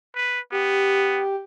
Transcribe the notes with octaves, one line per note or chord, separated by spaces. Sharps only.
B4
B3 G4